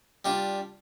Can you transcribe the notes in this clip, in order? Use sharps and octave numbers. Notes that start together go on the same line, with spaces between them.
G3 D4 F4